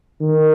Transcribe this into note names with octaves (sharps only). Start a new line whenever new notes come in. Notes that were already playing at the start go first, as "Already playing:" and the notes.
D#3